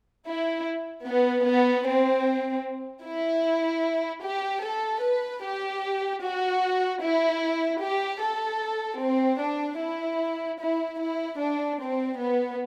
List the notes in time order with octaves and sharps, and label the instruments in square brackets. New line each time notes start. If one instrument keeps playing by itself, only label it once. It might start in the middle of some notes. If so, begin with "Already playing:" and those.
[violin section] E4
B3
B3
C4
E4
G4
A4
B4
G4
F#4
E4
G4
A4
C4
D4
E4
E4
E4
D4
C4
B3